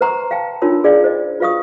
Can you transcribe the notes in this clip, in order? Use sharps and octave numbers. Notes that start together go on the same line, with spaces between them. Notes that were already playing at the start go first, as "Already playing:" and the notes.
B4 C5 F#5 A#5 C6 C#6
F5 G5 A5
D4 D#4 F4 A#4 C#5 C6
G#4 D5 F5 G5
C5 D#5
F4 B4 F5 C#6 D#6